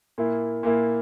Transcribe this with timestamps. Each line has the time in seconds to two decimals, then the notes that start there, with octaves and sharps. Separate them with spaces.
0.18 A#2 A#3 E4
0.63 A#2 A#3 E4